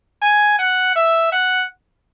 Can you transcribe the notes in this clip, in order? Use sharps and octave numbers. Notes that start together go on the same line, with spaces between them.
G#5
F#5
E5
F#5